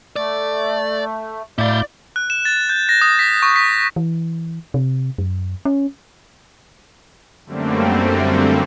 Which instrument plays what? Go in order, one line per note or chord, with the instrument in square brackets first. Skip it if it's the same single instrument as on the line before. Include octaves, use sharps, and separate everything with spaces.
[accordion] A3 [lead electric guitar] D5
[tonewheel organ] A2 G6 [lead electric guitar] E4 F5 [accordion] D5
[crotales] F#6
E7
A6
G6
A#6
D#6
B6
C#6
B6
[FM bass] E3
C3
F#2
C#4
[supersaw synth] F#2 D3 G3 A3 A#3 C4